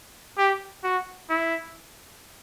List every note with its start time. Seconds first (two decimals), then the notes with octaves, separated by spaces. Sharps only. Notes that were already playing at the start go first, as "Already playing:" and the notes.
0.38 G4
0.84 F#4
1.30 E4